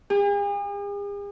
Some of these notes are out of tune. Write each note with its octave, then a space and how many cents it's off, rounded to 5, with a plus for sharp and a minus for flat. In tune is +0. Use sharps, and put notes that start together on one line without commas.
G#4 -45